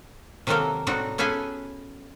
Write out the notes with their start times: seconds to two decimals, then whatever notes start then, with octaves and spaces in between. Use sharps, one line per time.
0.47 C3 D#3 F#3 A#3 A4 A#4
0.87 A2 G3 A3 C4 D#4 F#4
1.18 B3 C#4 G#4 A4 B4 G#5